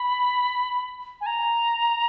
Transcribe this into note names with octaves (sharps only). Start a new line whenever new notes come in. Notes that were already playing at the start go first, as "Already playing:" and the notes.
Already playing: B5
G#5
A#5